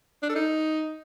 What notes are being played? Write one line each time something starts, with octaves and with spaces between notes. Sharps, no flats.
D4
A4
D#4